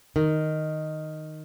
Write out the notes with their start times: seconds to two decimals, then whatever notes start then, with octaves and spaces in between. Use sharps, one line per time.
0.16 D#3